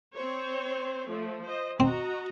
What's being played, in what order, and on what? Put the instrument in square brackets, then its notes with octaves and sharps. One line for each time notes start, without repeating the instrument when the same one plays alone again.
[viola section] C4 C5 C#5
F3 A3
C5 D#5
[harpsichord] C4 [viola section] F#4 D#5 A#5